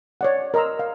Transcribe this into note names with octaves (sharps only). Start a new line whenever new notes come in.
C#5 D5 F#5
A#4 D#5 A#5 C6 E6
F5